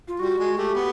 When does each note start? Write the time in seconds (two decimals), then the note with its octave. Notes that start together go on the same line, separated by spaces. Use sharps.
0.08 F4
0.19 G3 F#4
0.39 G#3
0.57 A3 G4
0.75 B3